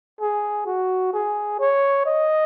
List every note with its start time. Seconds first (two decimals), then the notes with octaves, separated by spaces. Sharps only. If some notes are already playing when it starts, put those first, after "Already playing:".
0.21 G#4
0.66 F#4
1.13 G#4
1.60 C#5
2.06 D#5